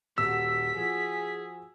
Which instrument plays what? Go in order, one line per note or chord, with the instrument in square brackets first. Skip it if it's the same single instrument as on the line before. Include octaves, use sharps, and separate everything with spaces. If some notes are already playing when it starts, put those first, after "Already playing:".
[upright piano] D#1 F#4 [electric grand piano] E6 [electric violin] B6
[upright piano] F3 F#4 [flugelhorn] G#4